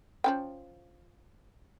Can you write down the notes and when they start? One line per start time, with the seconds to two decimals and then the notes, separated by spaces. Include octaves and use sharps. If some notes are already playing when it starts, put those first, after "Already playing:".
0.24 F3 C#4 G5